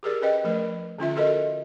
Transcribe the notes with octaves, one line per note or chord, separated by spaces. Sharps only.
G4 G#4 A#4 D5
C#4 B4 D#5 G5
F3 A3 A#4
D3 C#4 F4 E5
F#4 A4 A#4 D#5